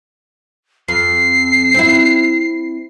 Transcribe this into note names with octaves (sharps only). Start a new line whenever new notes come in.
F2 C7
C4 E4